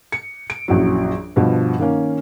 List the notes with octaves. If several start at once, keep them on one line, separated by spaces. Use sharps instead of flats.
C#7
D7
A#1 F#2 E3 F#3
G2 B2 F3
D#3 A#3 C#4